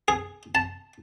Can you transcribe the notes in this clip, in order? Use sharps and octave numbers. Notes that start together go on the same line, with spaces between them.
G#4
A5